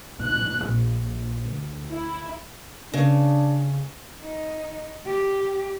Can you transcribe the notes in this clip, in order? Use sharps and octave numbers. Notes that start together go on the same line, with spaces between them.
F#6
A#1
D2
E4
C#3 D4
D#4
G4